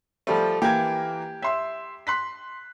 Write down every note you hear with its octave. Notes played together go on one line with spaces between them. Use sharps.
F3 G3 A3
E3 A#3 G4 G#6
E5 C6 E6
C6 F#6 B6